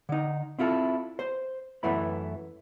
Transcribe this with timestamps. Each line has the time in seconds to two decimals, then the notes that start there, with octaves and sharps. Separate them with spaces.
0.09 D3 D#4
0.59 C4 E4 F4 A4
1.19 C5 C6
1.83 F#2 E3 A3 B3 E4 B5